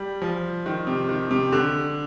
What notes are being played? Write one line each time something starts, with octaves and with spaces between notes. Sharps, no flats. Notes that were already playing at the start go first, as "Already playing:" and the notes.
Already playing: G3
F3
D#3
C3
D#3
C3
D3